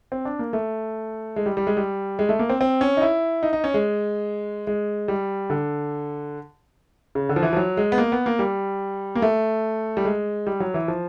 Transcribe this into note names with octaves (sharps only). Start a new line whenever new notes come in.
C4
D4
A#3
A3
G#3
G3
G3
G#3
G3
G#3
A3
A#3
C4
C4
C#4
D#4
E4
D#4
D#4
C#4
G#3
G#3
G3
D3
C#3
D3
F3
E3
F3
F#3
G#3
B3
A#3
B3
A#3
G3
A#3
A3
G3
G#3
G3
F#3
E3
F3